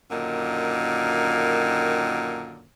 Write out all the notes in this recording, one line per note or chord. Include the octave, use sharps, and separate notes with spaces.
F#2 A#2 D3 D#3